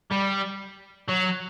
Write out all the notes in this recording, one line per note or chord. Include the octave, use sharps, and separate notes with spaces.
G3
F#3